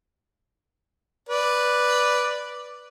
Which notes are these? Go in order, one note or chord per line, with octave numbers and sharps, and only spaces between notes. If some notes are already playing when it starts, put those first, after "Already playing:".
B4 D5